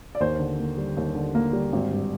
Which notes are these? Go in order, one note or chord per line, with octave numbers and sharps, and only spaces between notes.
D5
D#2 C5
D3
A#3
G3
D#2
D3
A#3
G3
G#1
G2